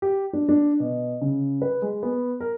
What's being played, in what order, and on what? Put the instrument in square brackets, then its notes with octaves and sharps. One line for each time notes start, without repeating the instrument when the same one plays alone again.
[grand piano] G4
D4
D4
B2
C#3
B4
G#3
B3
A#4